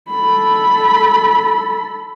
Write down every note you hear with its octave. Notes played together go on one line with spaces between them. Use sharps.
A4 B5